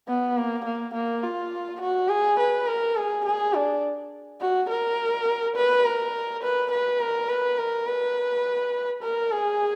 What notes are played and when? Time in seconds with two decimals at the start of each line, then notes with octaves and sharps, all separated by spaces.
0.08 B3
0.37 A#3
0.65 A#3
0.94 A#3
1.23 F4
1.81 F#4
2.09 G#4
2.39 B4
2.67 A#4
2.96 G#4
3.25 G#4
3.54 D4
4.41 F#4
4.70 A#4
5.56 B4
5.85 A#4
6.43 B4
6.71 B4
7.00 A#4
7.29 B4
7.58 A#4
7.87 B4
9.03 A#4
9.32 G#4